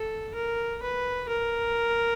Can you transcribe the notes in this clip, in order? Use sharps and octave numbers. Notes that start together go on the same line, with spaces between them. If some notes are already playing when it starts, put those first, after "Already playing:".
Already playing: A4
A#4
B4
A#4